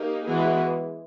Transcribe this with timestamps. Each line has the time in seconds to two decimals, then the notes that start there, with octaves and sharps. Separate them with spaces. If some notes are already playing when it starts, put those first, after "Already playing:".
Already playing: A#3 D#4 G4
0.26 E3 G#3 B3 E4 F#4 G#4